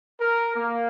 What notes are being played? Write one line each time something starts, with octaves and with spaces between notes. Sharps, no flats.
A#4
A#3